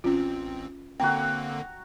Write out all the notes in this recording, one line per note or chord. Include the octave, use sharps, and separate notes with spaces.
A1 C4 C#4 F4
D3 A#3 C4 F#4 G5 A#5